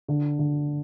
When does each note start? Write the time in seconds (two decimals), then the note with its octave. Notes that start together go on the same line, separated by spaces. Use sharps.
0.08 D3
0.39 D3